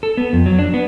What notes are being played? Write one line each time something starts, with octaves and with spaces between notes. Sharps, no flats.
A4
B3
F2
F#3
D4
B3